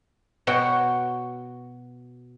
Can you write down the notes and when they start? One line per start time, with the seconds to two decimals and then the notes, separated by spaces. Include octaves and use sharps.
0.47 B2 F#4 C#5 G5